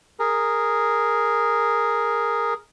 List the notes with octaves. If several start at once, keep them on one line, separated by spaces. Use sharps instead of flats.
G#4 A#4